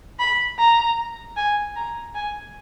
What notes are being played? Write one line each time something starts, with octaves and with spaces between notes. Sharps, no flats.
B5
A#5
G#5
A#5
G#5